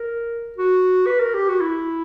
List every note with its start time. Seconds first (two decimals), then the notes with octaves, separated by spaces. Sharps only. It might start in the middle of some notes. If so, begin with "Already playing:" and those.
Already playing: A#4
0.58 F#4
1.06 B4
1.20 A#4
1.34 G4
1.48 F#4
1.61 E4